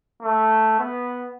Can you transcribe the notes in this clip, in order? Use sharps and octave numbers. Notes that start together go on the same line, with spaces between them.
A3
B3